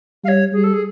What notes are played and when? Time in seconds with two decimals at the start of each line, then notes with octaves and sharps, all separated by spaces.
0.24 G3 F5
0.28 C#5
0.53 G3 G#4
0.64 A4
0.73 G#4